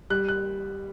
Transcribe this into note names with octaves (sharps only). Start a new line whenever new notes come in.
G3 F#6
F#6